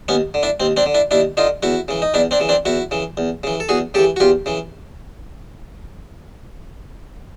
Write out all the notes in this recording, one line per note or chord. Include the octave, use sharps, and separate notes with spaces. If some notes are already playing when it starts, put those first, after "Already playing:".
D#2 B3 C#4
D3
D4 E4
D#2 C4
C4 D4
D3
D4 E4
D#2 D4 E4
D3 D#4 F4
E2 E4 F#4
C#3 E3
D#4
E2 D4 E4
C4 D4
C#3 E3
C4 D4
E2 E4 F#4
C#3 E3
E2
C#3 E3
A4
E2 F#4 G#4
C#3 E3 G4 A4
F#4
E2 F4 G4
C#3 E3